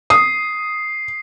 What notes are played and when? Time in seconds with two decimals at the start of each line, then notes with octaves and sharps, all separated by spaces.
0.10 D#6 C7